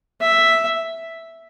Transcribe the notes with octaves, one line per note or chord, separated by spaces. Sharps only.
E5